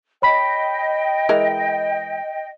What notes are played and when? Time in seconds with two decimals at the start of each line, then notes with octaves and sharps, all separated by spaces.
0.22 C#5 D#5 G5 B5 B6
1.29 E3 G#3 A#4